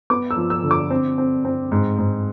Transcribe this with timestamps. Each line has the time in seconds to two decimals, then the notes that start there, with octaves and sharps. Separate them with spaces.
0.10 B3 D6
0.31 E6
0.36 F3
0.50 E6
0.63 D3
0.71 D6
0.90 C4
1.18 C4
1.45 C4
1.72 G#2
1.98 G#2